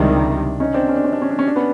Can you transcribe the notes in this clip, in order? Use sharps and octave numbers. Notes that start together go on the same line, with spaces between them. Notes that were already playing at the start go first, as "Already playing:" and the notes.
Already playing: C#2 C3 D#3 G3 D4 E4
C#4 D#4
C4 D4
C#4
D4
C#4
D4
C#4
D4
C#4
D4
B3 C#4